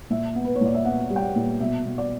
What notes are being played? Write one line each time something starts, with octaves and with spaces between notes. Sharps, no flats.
A#2 E5
B3
B4
C#5
A#2 D5
E5
B3 F#5
G3
G5
F#5
A#2
B2 E5
B2
D5